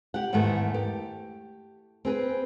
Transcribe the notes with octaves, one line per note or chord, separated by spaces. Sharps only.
G4 F#5
E2 G#2 D#3 A3 B3
G4
C4 G#4 B4